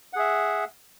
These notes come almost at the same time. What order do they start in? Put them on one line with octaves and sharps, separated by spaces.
F#5 G#4 E5